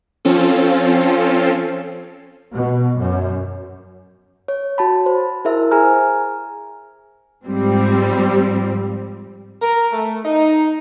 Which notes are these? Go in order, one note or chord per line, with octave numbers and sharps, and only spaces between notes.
F3 C4 C#4 F4 A4
B2
F#2
C#5
F#4 A5 B5
C5
E4 G#4 A#4 C5 E5
G#4 G#5 A#5 F6
G#2 F3 G3 C4
A#4
A3
D#4